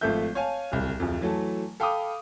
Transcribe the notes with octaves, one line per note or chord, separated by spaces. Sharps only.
G#1 F3 A3 A4 E5 G6
C#5 F5 G#5 A5
D1 C2
D1 F2
E3 F#3 A3 A5
A4 F5 G5 B5 D6 D#6